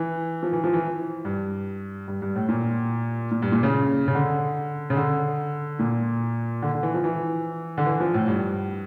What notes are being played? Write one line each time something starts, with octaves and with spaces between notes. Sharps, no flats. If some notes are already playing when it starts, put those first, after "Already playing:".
Already playing: E3
F3
E3
F3
E3
G2
G2
G2
A2
A#2
A#2
G2
A#2
C#3
C#3
D3
C#3
D3
A#2
D3
D3
E3
F3
E3
D3
E3
F3
A2
G2